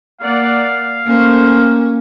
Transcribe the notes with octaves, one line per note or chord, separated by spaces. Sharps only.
A#3 D5 F5 F#5
A3 A#3 C#4 C5